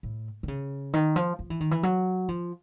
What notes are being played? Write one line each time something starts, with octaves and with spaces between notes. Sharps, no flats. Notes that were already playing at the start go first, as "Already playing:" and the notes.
A2
D3
C#3
D#3
F3
F3
E3
D#3
E3
F#3
F3